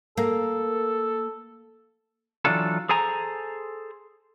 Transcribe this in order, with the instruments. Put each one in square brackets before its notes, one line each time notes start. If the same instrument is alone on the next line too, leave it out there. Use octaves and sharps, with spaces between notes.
[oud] A#3 [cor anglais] A4
[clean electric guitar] E3 F#3 D4 F4 A4
G#4 A4 C5 G#5 A#5